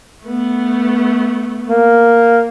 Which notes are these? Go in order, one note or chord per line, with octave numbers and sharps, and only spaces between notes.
A3 B3
A#3